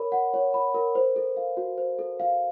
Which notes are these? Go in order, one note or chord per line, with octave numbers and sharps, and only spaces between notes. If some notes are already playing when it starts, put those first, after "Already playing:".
Already playing: A#4 C#5 B5
F#5
C#5
B5
A#4
C5
A4
F5
F#4
C5
A4
F5